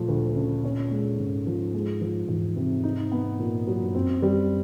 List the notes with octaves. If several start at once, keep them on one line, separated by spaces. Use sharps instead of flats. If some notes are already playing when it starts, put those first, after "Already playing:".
Already playing: A#2 F3 A3
D2
C#3
C#4
G#3
G#2 C#3
F3
G#3
F3
E2 G#2
C3
D#4
B3
A#2
F#3
G2
F#2 C4
G3